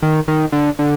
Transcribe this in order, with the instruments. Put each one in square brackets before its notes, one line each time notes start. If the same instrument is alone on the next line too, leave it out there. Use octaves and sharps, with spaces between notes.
[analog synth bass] D#3
D#3
D3
D3